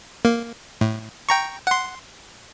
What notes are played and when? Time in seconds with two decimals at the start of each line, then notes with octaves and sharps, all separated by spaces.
0.25 A#3
0.81 A2
1.29 G5 A#5 C#6
1.67 F#5 C6